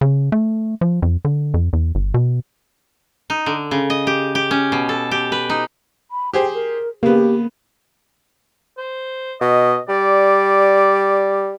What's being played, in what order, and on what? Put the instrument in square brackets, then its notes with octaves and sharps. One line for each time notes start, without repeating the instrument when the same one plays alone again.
[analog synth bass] C#3
A3
F3
F2
D3
F2
E2
G1
B2
[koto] D#4
D3
C#3
D#5
G4
G4
C#4
B2
A4
G4
B4
D#4
[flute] B5
[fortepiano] G4 G#4 C5 [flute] G5
[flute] A#4
[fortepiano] C#3 B3 [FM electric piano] A#3 [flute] G4
[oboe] C5
[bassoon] B2 [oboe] D#5
[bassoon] G3 [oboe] D5